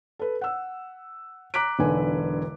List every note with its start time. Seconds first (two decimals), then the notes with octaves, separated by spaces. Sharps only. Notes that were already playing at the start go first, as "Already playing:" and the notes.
0.19 A4 B4
0.41 F#5 E6
1.54 A#5 D6 F#6 B6 D7
1.79 E1 B1 D3 B4 G#5